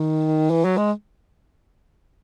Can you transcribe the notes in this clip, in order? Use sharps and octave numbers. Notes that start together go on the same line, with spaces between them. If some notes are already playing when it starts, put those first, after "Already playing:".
Already playing: D#3
E3
F#3
G#3